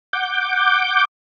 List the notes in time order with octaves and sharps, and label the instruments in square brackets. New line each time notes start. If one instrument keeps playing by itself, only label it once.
[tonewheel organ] F#5 D6 G6